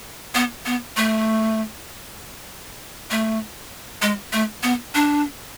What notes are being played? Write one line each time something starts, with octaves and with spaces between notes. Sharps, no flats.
B3
B3
A3
A3
G#3
A3
B3
D4